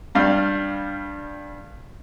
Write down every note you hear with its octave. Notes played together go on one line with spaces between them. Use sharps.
G2 G3 F5